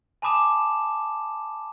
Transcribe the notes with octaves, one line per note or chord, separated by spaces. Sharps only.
G#5 A5 B5 D6 D#6 E7